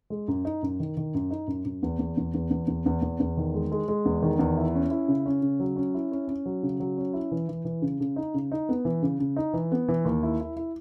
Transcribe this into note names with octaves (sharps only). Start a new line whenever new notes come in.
G#3
F#2
D#4
F#2
D#3
D#3
F#2
D#4
F#2
F#2
E2
E2
E2
E2
E2
E2
E2
E2
E2
D#3
G#3
G#3
G#3
E2
D#3
E2
E4
C#4
E4
C#3
C#4
C#3
F#3
C#4
E4
C#4
C#4
F#3
C#3
F#3
C#4
E4
E3
E3
E3
C#3
C#3
D#4
C#3
D#4
B3
E3
C#3
C#3
D#4
E3
B3
E3
D#2
E4
E4
E4